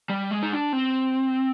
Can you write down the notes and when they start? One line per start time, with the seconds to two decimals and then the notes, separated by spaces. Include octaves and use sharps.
0.09 G3
0.31 G#3
0.43 D#4
0.52 D4
0.73 C4